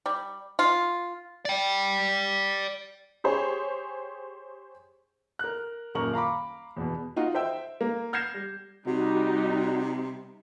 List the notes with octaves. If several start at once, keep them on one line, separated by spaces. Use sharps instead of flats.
G3
F4
D5 G5
G4 G#4 C5 C#5
A#4 F#6
D#1 F#2 A#4 C#6 F#7
F5 A#5 B5 D6
E2 B2
D#4 F4 F#4
C5 E5 G5 E6
A#3
F6 G6 G#6 A#6 C7 E7
G3
C3 G3 D#4 F#4